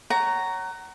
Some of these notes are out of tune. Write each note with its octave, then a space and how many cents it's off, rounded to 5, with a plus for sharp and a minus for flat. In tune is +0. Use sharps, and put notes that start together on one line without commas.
C#5 +5 F#5 +30 A#5 -5